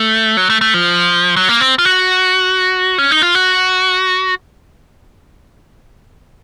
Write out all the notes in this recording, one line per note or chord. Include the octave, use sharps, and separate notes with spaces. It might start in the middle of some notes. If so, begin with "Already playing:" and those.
Already playing: A3
F#3
A3
A3
F3
F#3
A#3
C4
F4
F#4
C#4
D#4
F4
F#4